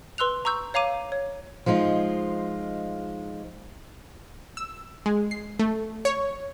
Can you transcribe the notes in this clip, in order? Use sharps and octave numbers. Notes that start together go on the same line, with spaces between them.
B4 C6 E6 F#6 F7
A#5 C#6 E6 G6
C#5 F5 A#5 D6 D#7
C#5
F3 G#3 D#4 F4
E6
G#3
C7
A3
C#5